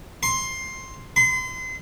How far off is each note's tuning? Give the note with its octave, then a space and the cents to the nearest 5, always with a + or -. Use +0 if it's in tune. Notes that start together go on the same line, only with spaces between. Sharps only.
C6 +10
C6 -35